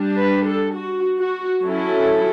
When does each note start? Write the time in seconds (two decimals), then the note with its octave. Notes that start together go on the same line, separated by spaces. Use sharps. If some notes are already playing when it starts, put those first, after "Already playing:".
Already playing: G3 D4
0.18 B4
0.47 A4
0.76 F#4
1.19 F#4
1.62 F#3 C#4 E4 A4